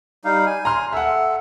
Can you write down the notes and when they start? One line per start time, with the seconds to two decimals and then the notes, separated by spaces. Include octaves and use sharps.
0.25 G3 D#4 F5
0.46 G#5
0.65 A#5 C6 F6
0.93 A4 E5 F#5